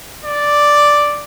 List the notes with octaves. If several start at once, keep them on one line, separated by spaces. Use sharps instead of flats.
D5